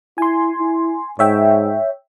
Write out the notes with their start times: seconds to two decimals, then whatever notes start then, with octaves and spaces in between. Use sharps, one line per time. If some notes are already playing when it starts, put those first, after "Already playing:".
0.18 E4 G#5 C6
0.59 E4
1.19 G#2 C#5 E5 G5